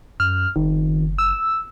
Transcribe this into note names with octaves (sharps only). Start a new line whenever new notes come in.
F#2 F6
F#1 D#3
E6